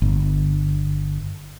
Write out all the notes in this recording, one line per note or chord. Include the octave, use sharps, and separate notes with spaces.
G1